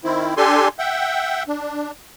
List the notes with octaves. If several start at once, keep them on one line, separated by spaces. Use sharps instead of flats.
D#3 C4 E4
D4 G4 A4 G#5 C6
E5 F#5 G5
D4